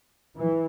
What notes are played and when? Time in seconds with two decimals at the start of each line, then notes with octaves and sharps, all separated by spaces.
0.37 E3